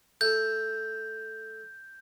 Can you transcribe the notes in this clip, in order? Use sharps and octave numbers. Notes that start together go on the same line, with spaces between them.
A3 A4 G6